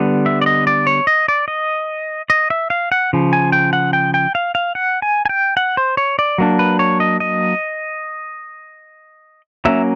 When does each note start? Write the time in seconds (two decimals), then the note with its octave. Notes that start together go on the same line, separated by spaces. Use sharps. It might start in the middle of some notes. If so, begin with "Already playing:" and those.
Already playing: D3 G3 B3
0.26 E5
0.41 D5
0.46 D#5
0.67 D5
0.87 C#5
1.07 D#5
1.28 D5
1.48 D#5
2.30 D#5
2.50 E5
2.70 F5
2.92 F#5
3.13 C#3 F3
3.33 G#5
3.52 G5
3.73 F#5
3.93 G5
4.14 G5
4.35 F5
4.55 F5
4.75 F#5
5.02 G#5
5.25 G#5
5.29 G5
5.57 F#5
5.77 C5
5.97 C#5
6.19 D5
6.38 F#3 A#3 D4
6.59 B4
6.79 C#5
7.00 D#5
7.20 D#5
9.65 F#3 A#3 C#4 E5